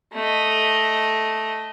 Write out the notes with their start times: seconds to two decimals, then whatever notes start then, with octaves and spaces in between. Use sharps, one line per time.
0.13 A3 D#5